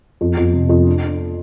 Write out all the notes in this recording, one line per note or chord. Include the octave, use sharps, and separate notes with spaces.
F2
F2
C3
F2
D4
D4